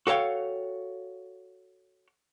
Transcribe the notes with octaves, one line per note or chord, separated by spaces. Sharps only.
F#4 A4 C#5 F5 G5